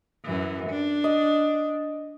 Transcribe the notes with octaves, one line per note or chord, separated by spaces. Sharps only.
F#2 E3
D4
D#5